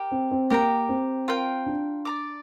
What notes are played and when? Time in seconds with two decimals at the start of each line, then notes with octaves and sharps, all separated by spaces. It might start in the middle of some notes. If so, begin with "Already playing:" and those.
Already playing: G4 A#4 G5
0.12 C4
0.31 C4
0.50 A#3 G4 A#4 G5 A#5
0.89 C4
1.28 F4 A#4 G5
1.66 D4
2.05 D5 A#5 D6